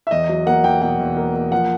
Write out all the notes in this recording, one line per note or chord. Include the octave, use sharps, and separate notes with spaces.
E5
E2 D#5
F#3
A#3 F#5
E2 G5
B2 G5
E2
A#3
A#3
F3 F#5